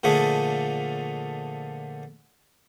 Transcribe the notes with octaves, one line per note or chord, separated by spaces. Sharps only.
A#2 D3 F3 A3 G#4